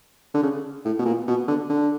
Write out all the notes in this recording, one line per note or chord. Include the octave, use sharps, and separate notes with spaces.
D3
C#3
A2
B2
A#2
B2
D3
D3